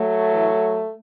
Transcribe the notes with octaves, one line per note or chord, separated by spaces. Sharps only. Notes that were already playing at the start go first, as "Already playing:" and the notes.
Already playing: F#3 A3
A2 E3